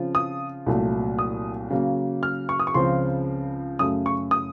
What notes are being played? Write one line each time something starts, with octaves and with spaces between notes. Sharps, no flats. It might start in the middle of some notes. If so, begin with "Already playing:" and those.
Already playing: C#3 F3 C4 F4
D#6
C2 A#2 F#3 A3
D#6
C#3 F#3 A#3
F6
C#6
D#6
C#6
C#2 C#3 F3 C4 C6
F#2 C#3 A3 D#6
C#6
D#6